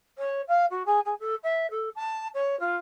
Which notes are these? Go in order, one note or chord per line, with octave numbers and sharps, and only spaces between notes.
C#5
F5
F#4
G#4
G#4
A4
E5
A4
A5
C#5
F4